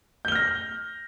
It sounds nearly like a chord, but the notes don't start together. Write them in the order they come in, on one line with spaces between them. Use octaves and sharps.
G6 G7 F6 A#6